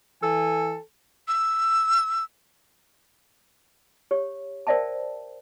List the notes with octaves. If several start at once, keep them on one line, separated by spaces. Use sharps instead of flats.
E3 A4 G#5
E6
G4 C#5
A#4 C5 D5 E5 G5 A5